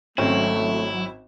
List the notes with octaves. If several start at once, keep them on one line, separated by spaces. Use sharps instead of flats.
G#1 F#3 A3 C4 C#4 E4